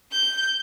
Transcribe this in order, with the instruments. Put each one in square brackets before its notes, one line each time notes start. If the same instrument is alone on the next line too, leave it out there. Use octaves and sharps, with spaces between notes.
[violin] G6